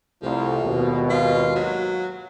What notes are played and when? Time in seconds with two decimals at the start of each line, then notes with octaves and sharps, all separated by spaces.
0.22 C2 F3 A3
0.63 G#1 D#2 B2
1.10 F4
1.56 F#3